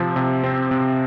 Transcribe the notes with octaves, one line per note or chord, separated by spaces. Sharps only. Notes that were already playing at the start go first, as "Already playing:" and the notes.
Already playing: C3 F3 C4
C3
C4
C3